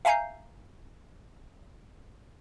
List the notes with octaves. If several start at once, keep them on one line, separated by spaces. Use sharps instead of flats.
E5 F5 G#5 A#5 G6 C7